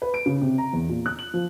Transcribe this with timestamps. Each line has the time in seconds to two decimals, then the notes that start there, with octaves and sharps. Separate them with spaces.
0.02 B4
0.14 D7
0.26 C#3
0.41 C3
0.58 A#5
0.73 E2
0.89 A#2
1.06 F#6
1.19 F#7
1.34 F3